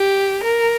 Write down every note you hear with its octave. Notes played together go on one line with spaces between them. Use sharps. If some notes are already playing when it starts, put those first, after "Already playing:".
Already playing: G4
A#4